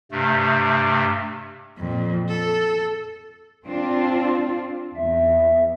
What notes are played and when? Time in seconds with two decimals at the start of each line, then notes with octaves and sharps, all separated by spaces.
0.11 G2 C3 A3
1.77 F2 A#2
2.28 A4
3.66 C4 D4 F4
4.96 E2 E5